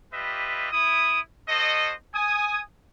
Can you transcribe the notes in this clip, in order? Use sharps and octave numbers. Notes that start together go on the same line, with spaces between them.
G3 F4 G4 B4 D#5 E5
E4 D#6
F#4 A4 C5 D#5
G#5 D#6